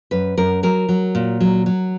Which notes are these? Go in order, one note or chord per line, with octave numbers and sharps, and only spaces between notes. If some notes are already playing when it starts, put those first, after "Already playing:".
F#2 B4
F#2 A#4
F#3 A#4
F#3
A#2
F#3
F#3